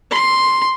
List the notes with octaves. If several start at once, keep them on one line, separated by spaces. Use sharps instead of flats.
C6